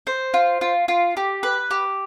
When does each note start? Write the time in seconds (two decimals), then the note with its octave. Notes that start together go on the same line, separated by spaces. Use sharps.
0.07 C5
0.34 F4
0.61 F4
0.88 F4
1.17 G4
1.43 B4
1.71 G4